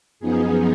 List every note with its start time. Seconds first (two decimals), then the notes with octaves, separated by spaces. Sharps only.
0.20 F#2 F3 B3 D#4 G#4